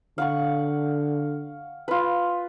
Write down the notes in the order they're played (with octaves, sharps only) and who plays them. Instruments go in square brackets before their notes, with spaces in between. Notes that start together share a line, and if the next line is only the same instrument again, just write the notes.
[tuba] D3 [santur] F5 F#5 C#6
[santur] F4 B4